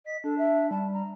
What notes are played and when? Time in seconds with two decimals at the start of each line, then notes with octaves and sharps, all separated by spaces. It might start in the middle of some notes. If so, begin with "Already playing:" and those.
0.06 D#5 B6
0.24 D4 A4
0.38 E5
0.71 G3 A5
0.93 A#5